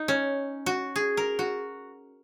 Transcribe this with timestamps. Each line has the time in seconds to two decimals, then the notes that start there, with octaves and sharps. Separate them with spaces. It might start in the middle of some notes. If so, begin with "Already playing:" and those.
Already playing: D#4
0.08 C#4
0.66 F#4
0.96 G#4
1.17 A#4
1.39 F#4